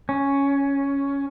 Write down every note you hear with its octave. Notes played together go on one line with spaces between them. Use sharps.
C#4